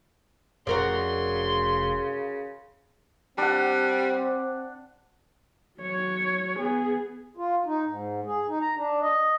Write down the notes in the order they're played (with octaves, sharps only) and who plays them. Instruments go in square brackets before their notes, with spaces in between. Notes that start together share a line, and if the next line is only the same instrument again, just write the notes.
[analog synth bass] F1 [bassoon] C#3 [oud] F#4 A#4 D5 [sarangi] C6
[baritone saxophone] G3 [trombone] C4 [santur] D4 F#5
[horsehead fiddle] F#3 C#5
B3 G#4
[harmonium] F4
D#4
G#2
G#4
D#4
A#5
D4
D#5